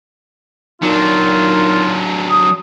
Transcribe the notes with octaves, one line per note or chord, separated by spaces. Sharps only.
A#2 F#3 D4 D#4 F4
D#6